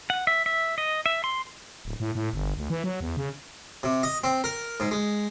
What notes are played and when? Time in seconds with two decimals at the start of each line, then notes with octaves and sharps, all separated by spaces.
0.10 F#5
0.27 E5
0.46 E5
0.78 D#5
1.06 E5
1.24 C6
1.85 D1
2.00 A2
2.15 A2
2.33 G1
2.57 D2
2.70 E3
2.84 F#3
3.00 E2
3.17 C#3
3.83 C3
4.03 D#5
4.24 C4
4.44 A#4
4.80 G#2
4.91 G#3